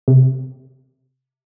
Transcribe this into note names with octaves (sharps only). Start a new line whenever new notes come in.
C3